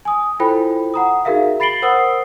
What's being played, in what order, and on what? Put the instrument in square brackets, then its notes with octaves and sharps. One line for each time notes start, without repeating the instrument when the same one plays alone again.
[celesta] G#5 D#6
E4 F4 A4 C5 G5 B5
F#5 A#5 D#6
D#4 F#4 G#4 A#4 E5 F5
B5 A6 C7 D7 F#7 G7
A#4 C5 F#5 D#6 E6 C7